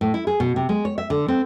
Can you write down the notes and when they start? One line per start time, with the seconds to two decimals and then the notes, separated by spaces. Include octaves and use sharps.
0.01 A2
0.14 E4
0.27 G#4
0.40 B2
0.56 C3
0.69 G#3
0.85 C#5
0.98 E5
1.10 D3
1.28 C4